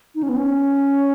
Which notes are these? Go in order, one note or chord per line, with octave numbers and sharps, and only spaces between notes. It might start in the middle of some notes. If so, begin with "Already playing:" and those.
D#4
C#4
B3
C#4